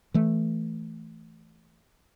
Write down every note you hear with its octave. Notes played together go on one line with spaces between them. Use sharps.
E3 A3